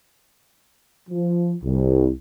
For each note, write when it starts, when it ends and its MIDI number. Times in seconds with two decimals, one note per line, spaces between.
1.10 1.55 53
1.64 2.10 36